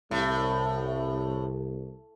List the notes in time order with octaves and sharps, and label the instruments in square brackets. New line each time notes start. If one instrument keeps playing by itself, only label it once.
[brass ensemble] C2 [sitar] A2